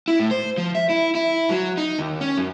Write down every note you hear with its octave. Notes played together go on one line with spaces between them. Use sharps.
E4
A2
C5
F3
E5
E4
E4
F#3
D#4
D#2
C#4
F#2